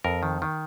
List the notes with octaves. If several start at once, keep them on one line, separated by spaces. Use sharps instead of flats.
F2 A#4
D#3
D#3